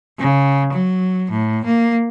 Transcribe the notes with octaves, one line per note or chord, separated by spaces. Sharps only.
C#3
F#3
A2
A#3